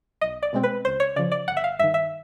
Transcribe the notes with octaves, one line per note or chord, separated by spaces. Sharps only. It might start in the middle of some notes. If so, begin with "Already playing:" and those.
B1 D#5
D5
B2 G#3 C4
B4
C#2 C5
C#5
C#3 F3 D5
D5
G1 F#5
E5
F5
G2 D#3 E5
E5